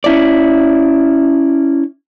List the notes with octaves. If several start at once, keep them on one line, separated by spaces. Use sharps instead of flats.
C#4 E4 D5